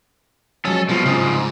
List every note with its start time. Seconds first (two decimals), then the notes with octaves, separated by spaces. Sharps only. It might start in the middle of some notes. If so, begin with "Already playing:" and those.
0.65 F3 F#3 G#3 C#4 A4 A5
0.89 C2 B2 F3 G#3 F4
1.05 G#2 C#3 C5